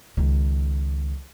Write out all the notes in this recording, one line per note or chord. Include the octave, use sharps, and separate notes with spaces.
C#2 D#3